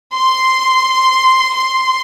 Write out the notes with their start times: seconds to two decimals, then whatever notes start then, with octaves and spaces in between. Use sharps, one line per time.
0.15 C6
1.57 C6